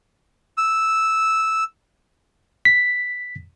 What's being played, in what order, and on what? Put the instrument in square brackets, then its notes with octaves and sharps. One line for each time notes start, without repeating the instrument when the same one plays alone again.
[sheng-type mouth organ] E6
[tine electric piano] B6